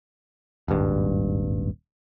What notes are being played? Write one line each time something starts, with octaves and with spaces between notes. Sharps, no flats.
D#1 G#1 G2